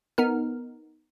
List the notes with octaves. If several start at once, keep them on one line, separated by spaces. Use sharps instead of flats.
B3 D#4 A#4 F6